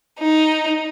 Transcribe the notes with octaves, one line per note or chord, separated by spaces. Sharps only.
D#4